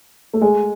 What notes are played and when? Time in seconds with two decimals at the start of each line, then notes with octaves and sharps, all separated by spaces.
0.34 A3
0.41 G#3